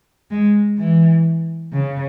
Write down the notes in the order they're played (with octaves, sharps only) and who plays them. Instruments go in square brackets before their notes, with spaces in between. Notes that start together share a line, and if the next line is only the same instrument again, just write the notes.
[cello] G#3
E3
C#3